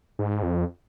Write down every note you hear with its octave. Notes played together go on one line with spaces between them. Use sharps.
G#2
F2